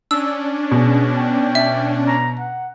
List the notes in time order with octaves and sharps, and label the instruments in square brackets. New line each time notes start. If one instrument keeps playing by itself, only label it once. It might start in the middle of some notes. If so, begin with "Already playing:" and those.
[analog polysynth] C#4 D4 [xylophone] E6
[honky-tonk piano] B2 [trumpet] G#4
[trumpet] G5
[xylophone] E5
[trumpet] A#5
F#5